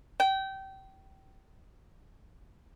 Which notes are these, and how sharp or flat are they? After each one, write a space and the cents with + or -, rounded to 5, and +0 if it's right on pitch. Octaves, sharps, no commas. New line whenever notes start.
G5 -25